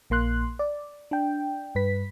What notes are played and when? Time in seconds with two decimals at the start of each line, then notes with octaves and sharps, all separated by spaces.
0.10 A#1 A#3 C6 F#6
0.59 D5
1.11 D4 G5
1.75 G2 B4 B6